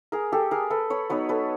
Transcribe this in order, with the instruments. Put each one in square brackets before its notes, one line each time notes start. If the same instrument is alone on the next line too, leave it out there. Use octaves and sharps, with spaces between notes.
[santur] G#4 A#4
G4 A4
G#4 A#4
A4 B4
B4 C#5
F#3 B3 D#4 B4 C#5
A4 B4